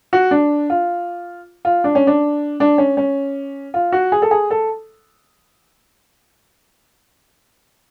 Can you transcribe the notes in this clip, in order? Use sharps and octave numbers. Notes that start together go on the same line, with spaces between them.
F#4
D4
F4
F4
D4
C#4
D4
D4
C#4
C#4
F4
F#4
G#4
A4
G#4
A4